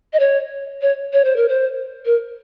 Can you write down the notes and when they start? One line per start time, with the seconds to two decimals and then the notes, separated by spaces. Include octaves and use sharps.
0.13 D#5
0.20 C#5
0.82 C#5
1.13 C#5
1.24 C5
1.36 A#4
1.48 C5
2.06 A#4